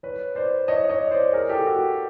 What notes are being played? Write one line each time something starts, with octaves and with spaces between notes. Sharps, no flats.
B4 C#5
C5 D5
C#5 D#5
C#5 D#5
C5 D5
G#4 A#4
G4 A4
F#4